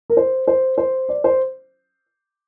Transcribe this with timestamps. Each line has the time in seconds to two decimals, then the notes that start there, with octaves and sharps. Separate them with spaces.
0.10 A#4
0.17 C5
0.48 C5
0.78 C5
1.09 D5
1.24 C5